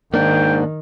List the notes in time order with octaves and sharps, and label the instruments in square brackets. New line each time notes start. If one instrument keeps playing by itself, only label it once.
[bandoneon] G#2 [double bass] D#3 [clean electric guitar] A#3 D4 [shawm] G5